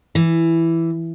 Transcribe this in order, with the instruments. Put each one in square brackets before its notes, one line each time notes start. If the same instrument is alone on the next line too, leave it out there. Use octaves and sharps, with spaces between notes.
[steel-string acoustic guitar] E3